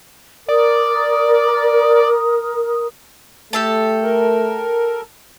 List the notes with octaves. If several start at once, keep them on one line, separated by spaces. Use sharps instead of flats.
A#4 D5 D#6
A3 G4 A4 A5
A#4